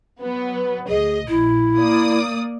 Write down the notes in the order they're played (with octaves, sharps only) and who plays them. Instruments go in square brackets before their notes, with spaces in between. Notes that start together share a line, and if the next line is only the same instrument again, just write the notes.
[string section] F#3 B3
[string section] D2 D#5 [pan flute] G#4
[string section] A#1 [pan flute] E4
[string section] A#3 D5 D#6